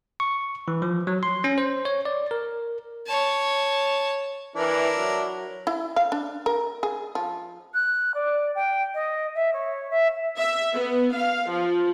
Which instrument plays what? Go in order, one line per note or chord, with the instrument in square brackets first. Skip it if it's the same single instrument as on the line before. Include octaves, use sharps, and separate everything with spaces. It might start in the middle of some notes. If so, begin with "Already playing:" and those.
[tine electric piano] C#6
E3
F3
F#3
C6
C#4
C5
C#5
D5
A#4
[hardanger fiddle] C#5 A5
[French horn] E3 [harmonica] D4 E4 A#4
[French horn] F#3
[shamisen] E4
F5
D4
A#4
G#4
F3
[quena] F#6
D5
G5
D#5
E5
C#5
E5
[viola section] E5
B3
F5
F3